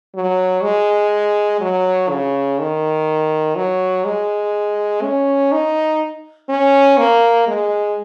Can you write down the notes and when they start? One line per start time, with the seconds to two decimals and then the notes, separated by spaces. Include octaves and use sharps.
0.15 F#3
0.63 G#3
1.61 F#3
2.10 C#3
2.59 D#3
3.56 F#3
4.05 G#3
5.02 C#4
5.52 D#4
6.49 C#4
6.98 A#3
7.47 G#3